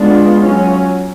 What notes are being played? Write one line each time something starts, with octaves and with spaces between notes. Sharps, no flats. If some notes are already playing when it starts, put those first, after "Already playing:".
Already playing: G#3 B3 D4 F4
F#3 C#4